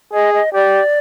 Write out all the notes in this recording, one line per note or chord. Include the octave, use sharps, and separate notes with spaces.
G#4 D#5
D#5
G4 D5